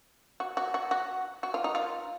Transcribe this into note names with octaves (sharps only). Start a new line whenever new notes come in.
F#4
F#4
F#4
F#4
F#4
F4
D#4
F4